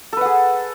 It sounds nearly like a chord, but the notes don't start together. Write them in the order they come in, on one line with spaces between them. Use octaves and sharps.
A4 B4 F#5 G#4